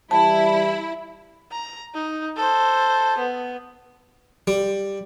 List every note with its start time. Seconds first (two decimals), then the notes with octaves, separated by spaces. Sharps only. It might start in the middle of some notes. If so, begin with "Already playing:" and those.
0.11 E3 G3 E4 A5
1.52 A#5
1.94 D#4
2.37 A4 C5
3.18 B3
4.47 G3